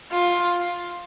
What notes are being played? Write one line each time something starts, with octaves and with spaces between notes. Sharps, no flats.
F4